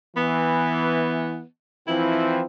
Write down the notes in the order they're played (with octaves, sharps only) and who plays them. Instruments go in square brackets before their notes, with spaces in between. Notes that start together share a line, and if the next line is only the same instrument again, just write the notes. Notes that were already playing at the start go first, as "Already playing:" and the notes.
[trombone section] E3 [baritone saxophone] B3
[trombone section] E3 F3 C4 [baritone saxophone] E4